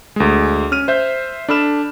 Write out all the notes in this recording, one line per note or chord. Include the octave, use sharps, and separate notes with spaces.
D2 G#3
C#4 F6 D#7
C5 E5 G6
D4 A4 B5 F6 E7